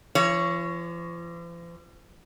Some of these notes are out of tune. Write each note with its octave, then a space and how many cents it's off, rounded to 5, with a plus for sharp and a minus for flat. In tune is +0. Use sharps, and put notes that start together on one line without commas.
F3 -45 C#5 +0